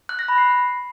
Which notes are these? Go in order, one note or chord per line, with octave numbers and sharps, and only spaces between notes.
F#6
A#6
B5
C7